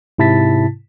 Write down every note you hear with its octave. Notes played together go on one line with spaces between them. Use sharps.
G#2 C3 E4 A5 A6 B6